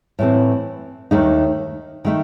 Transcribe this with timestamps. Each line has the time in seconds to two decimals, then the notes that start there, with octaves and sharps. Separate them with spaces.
0.19 A2 E3 A3 C4
1.11 D#2 D#3 A3 D#4
2.05 D#3 A3 D#4